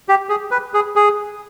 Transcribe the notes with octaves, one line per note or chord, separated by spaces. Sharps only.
G4
G#4
B4
G#4
G#4